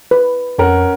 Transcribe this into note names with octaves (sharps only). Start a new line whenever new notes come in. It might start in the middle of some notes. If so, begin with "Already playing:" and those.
B4
F2 C#4 A#4 F#5